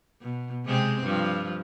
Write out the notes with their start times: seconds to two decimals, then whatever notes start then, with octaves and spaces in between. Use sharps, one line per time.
0.21 B2
0.66 C3 G#3 C4
1.03 G2 F3